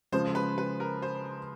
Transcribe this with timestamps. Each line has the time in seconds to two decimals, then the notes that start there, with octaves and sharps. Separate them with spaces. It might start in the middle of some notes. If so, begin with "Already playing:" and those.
0.12 C#3 F3 G#3 C5
0.35 B4
0.58 B4
0.80 A#4
1.02 C5